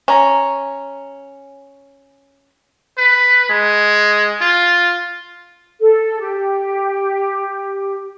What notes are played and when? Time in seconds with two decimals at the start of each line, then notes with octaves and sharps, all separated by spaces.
0.08 C#4 A#5
2.98 B4
3.50 G#3
4.41 F4
5.80 A4
6.19 G4